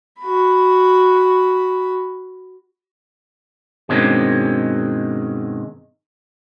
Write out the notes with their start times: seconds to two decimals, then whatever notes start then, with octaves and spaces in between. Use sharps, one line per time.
0.21 F#4 B5
3.89 G2 B2 D#3 G#3 C4 C#4